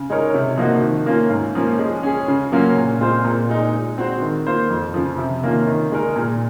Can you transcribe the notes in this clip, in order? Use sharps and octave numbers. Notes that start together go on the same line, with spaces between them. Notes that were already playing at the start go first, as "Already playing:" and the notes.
Already playing: C#3
G#3 D#4 A#4 C#5
C3
F3 A#3 D#4 F#4
D#3
A#3 C#4 F4
G#2
F3 A#3 C#4
G#3
C#4 G#4
C#3
F#3 A#3 C#4 F4
A#2
G#3 C4 F4 C5
A#2
G#3 D#4
G#3
C4 F#4 C5
D#3
A#3 F4 C5
F2
C#3 F3
C3
D#3 A#3 C#4 F4
D#3
G#3 D#4 A#4
A#2